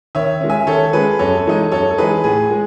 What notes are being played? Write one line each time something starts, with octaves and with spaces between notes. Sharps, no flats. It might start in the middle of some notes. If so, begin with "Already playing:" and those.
D#3 C#5 E5
G#3 C#4
E5 G#5
D#3 A4 C#5
G#3 C#4 G#4 B4
F#2 A4 C#5
E3 G#3 D#4
F#2 A4 C#5
A4
E3 G#3 D#4 G#4 B4
A2 G#4
G#3